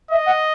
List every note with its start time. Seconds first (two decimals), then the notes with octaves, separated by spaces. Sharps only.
0.11 D#5 E5
0.26 F#5